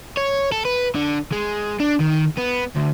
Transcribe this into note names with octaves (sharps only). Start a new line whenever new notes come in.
C#5
A4
B4
D3
G#3
D4
D#3
B3
D2